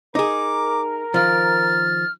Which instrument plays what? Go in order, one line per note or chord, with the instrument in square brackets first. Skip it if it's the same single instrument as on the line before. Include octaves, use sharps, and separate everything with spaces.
[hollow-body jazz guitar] D#4 G#4 [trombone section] A#4 [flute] D6
[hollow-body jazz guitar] D#3 F3 [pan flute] F6 [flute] A6